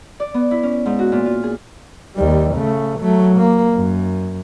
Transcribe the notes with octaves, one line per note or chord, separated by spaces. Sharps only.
D5
B3
E4
C#4
G#2
F#4
A#2
F4
G#4
D#2 G3
C#3 A3
F#3 A3
A#3
F#2